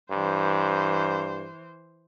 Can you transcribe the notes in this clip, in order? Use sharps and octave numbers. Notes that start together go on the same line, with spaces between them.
G2 E3 C5